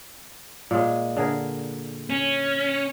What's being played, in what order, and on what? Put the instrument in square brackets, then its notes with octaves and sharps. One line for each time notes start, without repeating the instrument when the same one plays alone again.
[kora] A#2 G#3
D3 G#4 A#4
[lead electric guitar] C#4